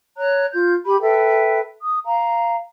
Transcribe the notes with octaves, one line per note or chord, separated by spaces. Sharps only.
C#5 A#5 F#6
F4 G6
G4 B5
A4 B4 E5 G5
D#6
F5 A#5